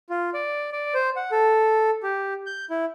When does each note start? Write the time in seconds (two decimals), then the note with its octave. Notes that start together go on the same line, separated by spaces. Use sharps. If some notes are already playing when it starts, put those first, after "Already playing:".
0.10 F4
0.34 D5
0.72 D5
0.94 C5
1.16 F#5
1.31 A4
2.03 G4
2.46 G6
2.70 E4